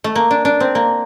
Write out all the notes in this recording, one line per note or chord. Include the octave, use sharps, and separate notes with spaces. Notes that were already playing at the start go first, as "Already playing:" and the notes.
A3
A#3
D4
D4
C4
A#3